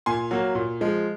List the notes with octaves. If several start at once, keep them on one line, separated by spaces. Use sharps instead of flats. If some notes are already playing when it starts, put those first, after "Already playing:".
A#2 G#5 C6
F#3 A#3
A#2
F3 G#3